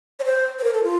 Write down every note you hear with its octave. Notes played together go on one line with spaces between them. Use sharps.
C#5
C5
C5
A#4
A4
F4